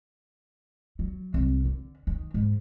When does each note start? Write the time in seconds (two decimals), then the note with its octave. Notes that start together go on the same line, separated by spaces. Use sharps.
0.99 F#3
1.34 C2
1.65 D3
2.07 D#3
2.34 G#2